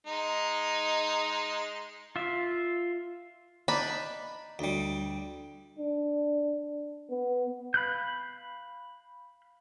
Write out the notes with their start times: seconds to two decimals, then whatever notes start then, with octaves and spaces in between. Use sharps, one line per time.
0.07 G#3 D#4
2.16 F4 E5
3.68 D4 D#4 B5
4.59 D2 G3
5.79 D4
7.10 B3
7.74 F5 B5 F#6 G6